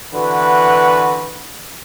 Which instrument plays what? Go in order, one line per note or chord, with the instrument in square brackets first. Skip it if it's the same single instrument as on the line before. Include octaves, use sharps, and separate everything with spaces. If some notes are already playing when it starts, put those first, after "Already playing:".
[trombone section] D3 E3 F#4 B4